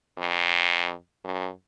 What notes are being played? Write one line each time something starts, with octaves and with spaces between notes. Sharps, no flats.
F2
F#2